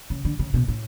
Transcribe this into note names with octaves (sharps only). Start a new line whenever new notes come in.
C#3
D3
C#3
B2
A2